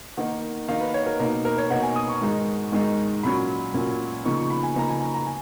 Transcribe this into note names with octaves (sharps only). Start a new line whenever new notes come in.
D#3 A#3 D#4 F#5
D#3 A#3 D#4 F5
B4
C#5
A#4
B2 A#3 D#4 A#4
A#4
C#5
B2 A#3 D#4 F#5
G#5
D#6
C#6
G#2 D#3 G#3 D#4
G#2 D#3 G#3 D#4
A#2 F#3 C#4 B5
A#2 F#3 C#4
C#3 F3 A#3 D#4 C#6
C#6
B5
G#5
C#3 F3 A#3 D#4 A#5
G#5
A#5
A#5
G#5